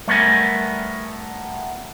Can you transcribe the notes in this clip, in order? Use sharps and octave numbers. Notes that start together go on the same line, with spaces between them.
G3 A3 B3 A#4 G#5